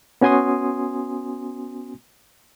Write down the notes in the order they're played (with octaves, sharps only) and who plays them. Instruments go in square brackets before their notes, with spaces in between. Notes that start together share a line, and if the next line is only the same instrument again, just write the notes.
[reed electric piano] B3 C#4 F#4 G#5 C6 D#6